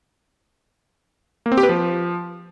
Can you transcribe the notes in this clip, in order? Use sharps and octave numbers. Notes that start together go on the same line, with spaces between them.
A#3
C4
G4
B4
F3